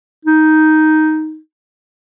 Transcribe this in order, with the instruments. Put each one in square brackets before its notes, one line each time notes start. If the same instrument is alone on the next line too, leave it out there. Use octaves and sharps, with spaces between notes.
[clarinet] D#4